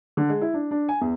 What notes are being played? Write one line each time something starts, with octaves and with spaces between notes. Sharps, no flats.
D3
G#3
E4
D4
D4
G#5
E2